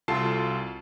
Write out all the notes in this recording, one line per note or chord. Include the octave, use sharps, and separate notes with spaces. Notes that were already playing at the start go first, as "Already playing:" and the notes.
C2 F4 F#4 A4 A5 C7